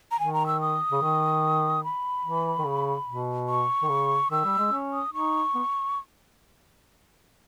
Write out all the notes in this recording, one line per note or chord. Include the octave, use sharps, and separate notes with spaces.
A#5
D#3 G#5
A#5
E6
D#6
C#3
D#3
B5
E3
D#3
C#3
B2
C#6
D#3
C#3
D#3 E6
G3
G#3
C#4
D#6
D#4 C#6
B3